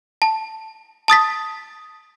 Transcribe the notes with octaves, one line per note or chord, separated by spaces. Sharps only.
A5
A5 D#6 A6 B6